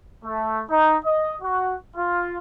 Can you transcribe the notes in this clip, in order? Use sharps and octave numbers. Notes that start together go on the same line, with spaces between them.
A3
D#4
D#5
F#4
F4